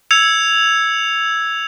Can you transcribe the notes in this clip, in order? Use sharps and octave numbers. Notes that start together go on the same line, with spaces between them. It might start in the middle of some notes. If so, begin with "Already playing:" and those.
E6 G#6 C#7 F7